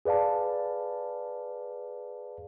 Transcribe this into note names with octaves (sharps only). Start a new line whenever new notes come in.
G#4 B4 D5 F5 A5